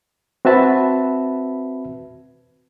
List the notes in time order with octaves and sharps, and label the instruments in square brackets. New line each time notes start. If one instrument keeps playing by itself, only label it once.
[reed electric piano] C4 F#4 B4 E5 A5 B5